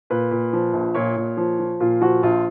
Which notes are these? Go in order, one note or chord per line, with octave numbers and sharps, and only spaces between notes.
A#2 B4
A#2
F3
A#1
A#2 C#5
A#2
F3
F3
A#2 F4
F3 F#4
A#1 F4